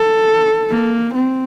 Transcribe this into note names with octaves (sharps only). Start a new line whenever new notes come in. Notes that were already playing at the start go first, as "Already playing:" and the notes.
Already playing: A4
A#3
C4